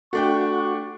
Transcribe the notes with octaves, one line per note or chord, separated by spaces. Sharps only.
A3 D4 F#4 G5 C#6